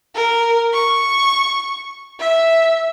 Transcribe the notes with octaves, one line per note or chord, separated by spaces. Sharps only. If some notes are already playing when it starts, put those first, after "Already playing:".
A#4
C#6
E5